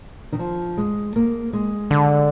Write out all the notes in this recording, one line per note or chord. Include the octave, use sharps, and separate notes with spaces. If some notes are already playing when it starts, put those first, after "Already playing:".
D#3
F3
G#3
A#3
G#3
D3